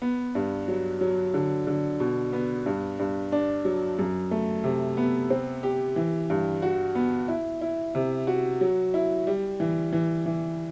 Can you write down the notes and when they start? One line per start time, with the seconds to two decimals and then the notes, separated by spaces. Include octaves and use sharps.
0.02 B3
0.35 G2
0.68 F#3
1.01 F#3
1.34 D3
1.67 D3
2.00 B2
2.33 B3
2.66 G2
2.99 G2
3.32 D4
3.65 F#3
3.99 F#2
4.31 A3
4.64 C3
4.97 B3
5.30 C4
5.63 G4
5.96 E3
6.30 G2
6.62 F#4
6.95 B3
7.28 E4
7.61 E4
7.95 C3
8.27 F#4
8.61 F#3
8.94 E4
9.27 G3
9.60 E3
9.93 E3
10.26 E3